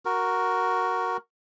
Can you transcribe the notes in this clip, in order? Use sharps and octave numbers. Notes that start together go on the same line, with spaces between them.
F#4 A#4